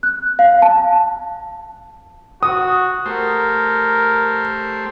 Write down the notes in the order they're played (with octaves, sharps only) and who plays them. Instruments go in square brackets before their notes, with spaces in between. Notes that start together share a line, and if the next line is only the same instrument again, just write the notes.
[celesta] F#6
F5
A5
[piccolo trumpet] F#4 [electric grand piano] D#6
[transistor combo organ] A3 G4 C5 [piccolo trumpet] A#4